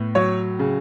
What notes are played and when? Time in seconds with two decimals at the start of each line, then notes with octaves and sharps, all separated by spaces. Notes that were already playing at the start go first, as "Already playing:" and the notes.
Already playing: A2 B3
0.15 F#3 C#5
0.59 C#3